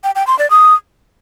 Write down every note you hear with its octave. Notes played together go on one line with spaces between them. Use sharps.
G5
G5
C6
D5
D#6